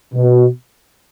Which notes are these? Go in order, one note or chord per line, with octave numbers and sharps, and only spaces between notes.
B2